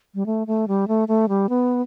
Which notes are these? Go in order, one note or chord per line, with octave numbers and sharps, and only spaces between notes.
G3
A3
A3
G3
A3
A3
G3
B3